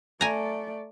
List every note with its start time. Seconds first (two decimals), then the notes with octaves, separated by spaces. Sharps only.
0.21 A3 D5 G#5 A#5